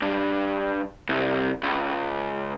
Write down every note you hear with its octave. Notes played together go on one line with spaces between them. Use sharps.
G2
C2
C#2